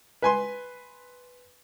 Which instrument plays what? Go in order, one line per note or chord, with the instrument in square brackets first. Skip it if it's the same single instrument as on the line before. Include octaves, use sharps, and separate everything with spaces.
[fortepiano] B4 G#5 C6